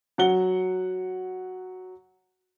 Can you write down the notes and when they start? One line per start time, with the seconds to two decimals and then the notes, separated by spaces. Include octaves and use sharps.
0.18 F#3 F#5 G7